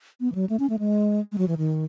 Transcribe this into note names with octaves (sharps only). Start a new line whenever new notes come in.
B3
E3
F#3
A3
C#4
A3
G#3
G#3
F#3
E3
D#3